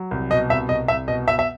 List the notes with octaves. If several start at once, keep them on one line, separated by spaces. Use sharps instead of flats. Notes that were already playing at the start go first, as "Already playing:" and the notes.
Already playing: F#3
C2
B2 D#5
C2 E5
C2 D#5
C2 E5
B2 D#5
B2 E5
E5